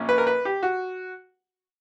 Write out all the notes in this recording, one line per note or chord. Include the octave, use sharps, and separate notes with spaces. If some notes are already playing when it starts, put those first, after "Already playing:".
Already playing: A#1 A#2 A#3 C#4
B4
A#4
B4
G4
F#4